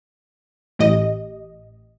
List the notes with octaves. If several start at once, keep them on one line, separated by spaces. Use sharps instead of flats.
A1 G4 D#5